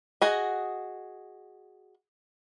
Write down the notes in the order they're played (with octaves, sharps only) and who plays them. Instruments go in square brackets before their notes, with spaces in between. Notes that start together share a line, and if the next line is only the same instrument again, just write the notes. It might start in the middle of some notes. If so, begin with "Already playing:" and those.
[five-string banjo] F#4 G#4 D#5